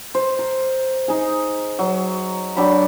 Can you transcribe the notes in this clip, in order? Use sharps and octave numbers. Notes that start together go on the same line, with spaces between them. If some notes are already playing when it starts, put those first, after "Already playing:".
C5
A#4
D#4 G#4
F#3
F#3 D4 G5 B5